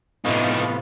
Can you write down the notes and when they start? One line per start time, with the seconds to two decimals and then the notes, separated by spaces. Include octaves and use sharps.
0.25 A2 C3 F3 B3 D#4 F4